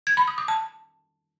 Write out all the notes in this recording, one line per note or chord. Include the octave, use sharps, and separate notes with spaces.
G#6
B5
D#6
D6
A5